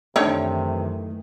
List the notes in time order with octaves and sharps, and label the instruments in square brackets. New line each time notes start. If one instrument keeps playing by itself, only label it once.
[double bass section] F#2 D#3 E3 [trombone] C3 [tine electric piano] A3 [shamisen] D4 D#4 C#5